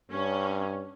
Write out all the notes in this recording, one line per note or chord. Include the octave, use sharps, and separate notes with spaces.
G2 C#4